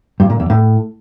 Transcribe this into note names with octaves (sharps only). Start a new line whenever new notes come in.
G2
A#2
E2
A2